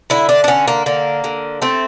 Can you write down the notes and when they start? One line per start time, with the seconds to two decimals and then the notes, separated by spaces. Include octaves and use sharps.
0.10 D3 E4
0.29 D4
0.44 D4
0.48 D3 C#4
0.68 A#3
0.86 D3 A#3
1.24 D3
1.62 A3 C4